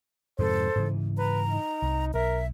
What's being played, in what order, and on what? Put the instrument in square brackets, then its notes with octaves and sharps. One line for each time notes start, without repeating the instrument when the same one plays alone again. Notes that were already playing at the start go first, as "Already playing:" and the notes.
[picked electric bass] F2 G#2 C3 [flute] A4 [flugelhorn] C5
[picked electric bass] G#2 C#3 E3
[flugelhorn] B4 [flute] A#5
[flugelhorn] D#4
[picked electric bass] C2
[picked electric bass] B1 [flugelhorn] A#4 [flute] E5